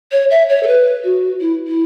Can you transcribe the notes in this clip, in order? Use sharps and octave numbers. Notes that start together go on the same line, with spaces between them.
C#5
E5
C#5
A4
B4
F#4
E4
E4